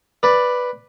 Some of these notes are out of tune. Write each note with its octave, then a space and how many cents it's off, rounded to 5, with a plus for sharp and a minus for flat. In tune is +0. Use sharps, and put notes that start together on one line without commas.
B4 +0 D5 +5